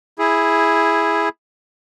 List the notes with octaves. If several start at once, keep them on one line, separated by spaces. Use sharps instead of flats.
E4 G#4